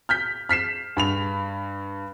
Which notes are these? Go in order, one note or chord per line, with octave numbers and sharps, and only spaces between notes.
F6 G6 B6
F6 B6 C7 E7
G2 B5 F7